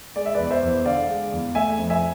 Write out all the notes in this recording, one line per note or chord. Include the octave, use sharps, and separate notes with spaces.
G#3 D5
E5
E2 B4 D5
C5 E5
E2
D3 D5 F5
G#3
E2
A3 E5 G#5
F2
E5 G#5